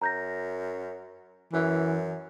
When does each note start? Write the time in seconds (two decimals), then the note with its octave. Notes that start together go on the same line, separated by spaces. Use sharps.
0.02 F#2 A#5 G6 A#6
1.53 F#2 E3